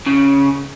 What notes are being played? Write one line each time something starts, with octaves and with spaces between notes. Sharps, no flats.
C#3